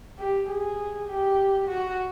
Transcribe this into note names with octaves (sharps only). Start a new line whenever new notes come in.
G4
G#4
G4
F#4